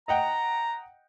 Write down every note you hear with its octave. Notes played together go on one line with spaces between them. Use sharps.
D#5 F#5 G5 A#5